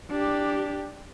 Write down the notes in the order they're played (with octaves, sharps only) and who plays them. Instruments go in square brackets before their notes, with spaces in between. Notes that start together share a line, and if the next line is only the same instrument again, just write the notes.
[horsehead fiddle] D4 G4